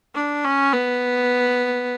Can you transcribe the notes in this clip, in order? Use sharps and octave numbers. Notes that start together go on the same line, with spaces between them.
D4
C#4
B3